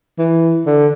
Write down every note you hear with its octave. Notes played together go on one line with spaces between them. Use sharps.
E3
D3